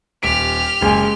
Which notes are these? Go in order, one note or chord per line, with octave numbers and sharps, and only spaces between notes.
D#1 G4 F6 B6 D7
F#1 G#3 G#5